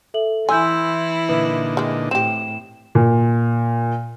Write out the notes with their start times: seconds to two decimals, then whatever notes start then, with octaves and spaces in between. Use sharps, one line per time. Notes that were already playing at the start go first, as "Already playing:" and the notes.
0.14 A4 E5 F#7
0.49 E3 E4 G#5 C6 E6 G6
1.29 A#2 D3 D#4 B4
1.77 D#3 G#3
2.11 A2 C4 G4 E7
2.95 A#2